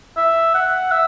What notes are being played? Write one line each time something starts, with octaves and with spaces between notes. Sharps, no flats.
E5
F#5
E5